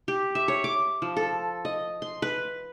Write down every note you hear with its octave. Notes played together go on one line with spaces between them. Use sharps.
G4
E5
C#5
D6
F3
A4
D#5
C6
B4